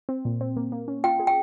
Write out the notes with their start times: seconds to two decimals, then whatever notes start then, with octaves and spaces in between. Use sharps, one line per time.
0.09 C4
0.25 A#2
0.41 C4
0.57 A#3
0.72 A#3
0.88 C#4
1.04 F4 G5
1.20 G#4
1.27 G5